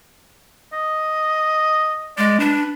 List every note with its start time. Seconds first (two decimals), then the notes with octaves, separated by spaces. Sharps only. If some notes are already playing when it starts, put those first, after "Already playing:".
0.73 D#5
2.18 G#3 D5
2.40 D4 B4